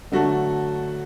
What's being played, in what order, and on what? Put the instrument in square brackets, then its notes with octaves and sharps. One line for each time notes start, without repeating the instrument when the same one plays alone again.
[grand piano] D3 F#3 [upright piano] A3 F#4 A4